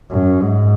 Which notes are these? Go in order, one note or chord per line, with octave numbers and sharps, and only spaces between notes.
F#2
G#2